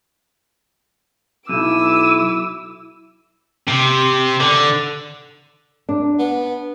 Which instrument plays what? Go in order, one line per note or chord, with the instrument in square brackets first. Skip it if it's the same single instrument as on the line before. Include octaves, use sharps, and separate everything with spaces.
[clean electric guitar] B1 [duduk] E4 [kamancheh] D6 E6 [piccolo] D#7
[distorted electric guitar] C3
D3
[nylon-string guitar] D4
[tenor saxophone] B3